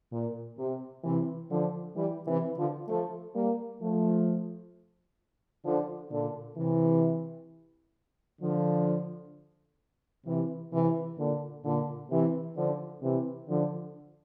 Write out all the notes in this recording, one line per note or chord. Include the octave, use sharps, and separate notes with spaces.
A#2
C3
C3 E3
D3 F3
E3 G3
C3 E3
D3 F3
F3 A3
G3 A#3
F3 A3
D3 F3
A#2 D3
C3 E3
D3 F3
C3 E3
C3 E3
A#2 D3
A#2 D3
C3 E3
D3 F3
C3 E3
D3 F3